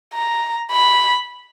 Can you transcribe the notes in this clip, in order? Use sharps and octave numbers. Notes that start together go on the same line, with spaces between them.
A#5
B5